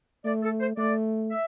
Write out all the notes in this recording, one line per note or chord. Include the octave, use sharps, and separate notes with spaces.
A3 D5
A4
C5
A3 D5
E5